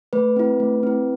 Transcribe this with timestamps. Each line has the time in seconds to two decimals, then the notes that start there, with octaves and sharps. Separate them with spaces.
0.13 A3 B4
0.36 C4 E4
0.60 A3
0.83 C4 E4